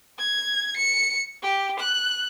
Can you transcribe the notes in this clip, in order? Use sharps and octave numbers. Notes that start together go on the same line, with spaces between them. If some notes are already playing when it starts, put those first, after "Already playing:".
G#6
C#7
G4
F#6